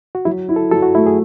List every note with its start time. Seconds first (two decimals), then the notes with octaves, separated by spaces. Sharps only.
0.15 F#4
0.25 F#3 E4
0.49 E4
0.56 A4
0.71 F#3 A4
0.83 F#4
0.95 A3 E4
1.06 G#4